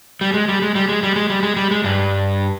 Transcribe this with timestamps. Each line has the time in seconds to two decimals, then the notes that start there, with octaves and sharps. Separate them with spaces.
0.21 G3
0.34 G#3
0.48 G3
0.62 G#3
0.75 G3
0.89 G#3
1.03 G3
1.16 G#3
1.30 G3
1.43 G#3
1.56 G3
1.71 G#3
1.84 G2 G3